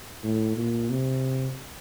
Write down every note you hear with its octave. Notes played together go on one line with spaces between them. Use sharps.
A2
A#2
C3